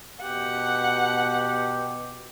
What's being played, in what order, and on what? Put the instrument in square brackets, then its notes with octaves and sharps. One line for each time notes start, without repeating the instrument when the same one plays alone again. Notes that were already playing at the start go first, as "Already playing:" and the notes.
[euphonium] B2 [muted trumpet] G4 [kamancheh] F#5